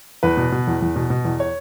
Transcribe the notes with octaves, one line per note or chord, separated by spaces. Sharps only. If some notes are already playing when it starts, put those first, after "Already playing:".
E2 B4
B2
B2
E2
E2
B2
B2
E2
C#5